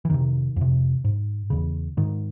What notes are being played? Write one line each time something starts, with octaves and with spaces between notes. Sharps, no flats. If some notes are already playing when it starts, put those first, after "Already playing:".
E3
F2 C3 D#3
F2 C3
G#2
E2 C#3
G#2 D#3